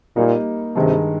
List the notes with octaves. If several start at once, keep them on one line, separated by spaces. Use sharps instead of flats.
A#2 G3 A#3 D#4
G2 C3 D#3 G#3